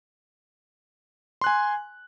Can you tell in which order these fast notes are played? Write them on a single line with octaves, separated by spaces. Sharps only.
C6 F#6 G#5